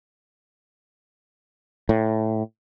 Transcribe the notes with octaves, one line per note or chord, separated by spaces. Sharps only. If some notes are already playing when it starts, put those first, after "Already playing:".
A2